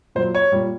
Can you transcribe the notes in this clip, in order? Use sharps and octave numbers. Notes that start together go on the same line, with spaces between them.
A#2 F#3 C5
C#5
A#2 G3